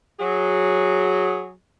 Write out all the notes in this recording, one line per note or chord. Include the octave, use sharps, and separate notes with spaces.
F#3 G#4